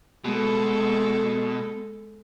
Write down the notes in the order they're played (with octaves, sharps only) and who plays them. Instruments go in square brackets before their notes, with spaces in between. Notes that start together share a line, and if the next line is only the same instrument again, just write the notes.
[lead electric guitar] B2 [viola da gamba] G#3 A4